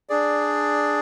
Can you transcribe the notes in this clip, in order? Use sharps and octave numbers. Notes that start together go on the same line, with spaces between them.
D4 G#4 D5